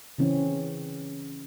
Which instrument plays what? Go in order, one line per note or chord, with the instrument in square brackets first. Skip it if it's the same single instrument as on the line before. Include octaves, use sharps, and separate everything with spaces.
[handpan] C#3 E3 C4 C#4